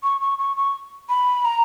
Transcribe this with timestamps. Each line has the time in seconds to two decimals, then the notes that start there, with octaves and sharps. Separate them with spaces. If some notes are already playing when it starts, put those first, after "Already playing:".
0.03 C#6
0.21 C#6
0.39 C#6
0.57 C#6
1.09 B5
1.45 A#5